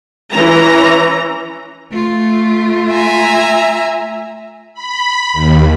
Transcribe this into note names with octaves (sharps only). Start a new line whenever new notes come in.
E3 C#4 A#5
A3 F4
E5 G#5 A#5
B5
D#2